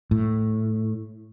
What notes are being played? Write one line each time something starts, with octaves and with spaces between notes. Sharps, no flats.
A2